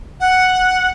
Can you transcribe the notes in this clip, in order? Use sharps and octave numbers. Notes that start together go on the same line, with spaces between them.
F#5